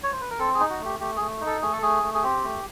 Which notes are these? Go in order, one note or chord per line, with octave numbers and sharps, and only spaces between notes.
C#5
C5
B4
A#4
C4 A4
G#4
D#4
F#4
A3 G4
A3 G4
A3 G#4
D#4
A4
A3 G#4
A4
A3 G#4
A3
G#4
C4 G4
A3